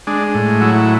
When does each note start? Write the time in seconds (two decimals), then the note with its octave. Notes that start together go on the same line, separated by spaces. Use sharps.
0.07 G#3 D4
0.34 A2
0.61 F#3 E4